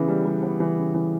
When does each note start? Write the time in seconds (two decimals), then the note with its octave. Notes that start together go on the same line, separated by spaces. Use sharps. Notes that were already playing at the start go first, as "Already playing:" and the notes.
Already playing: C#3 E3 B3
0.08 G3
0.25 G3
0.43 B3
0.60 E3
0.78 C#3
0.95 E3